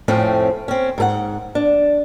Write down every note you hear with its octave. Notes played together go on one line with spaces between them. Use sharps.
F2 A2 A3 C4 C#4
C4 C#4
G#2 A4 F#5
D4